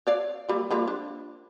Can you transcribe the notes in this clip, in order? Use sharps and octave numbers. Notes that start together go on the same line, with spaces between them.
C#5 D5 F5
F#3 G3 A#3
F3 G3 A#3
D4